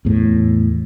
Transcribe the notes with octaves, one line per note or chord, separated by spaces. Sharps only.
E2 A2